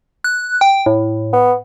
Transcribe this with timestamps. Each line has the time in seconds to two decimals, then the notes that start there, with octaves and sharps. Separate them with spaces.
0.24 F#6
0.61 G5
0.86 A2
1.33 B3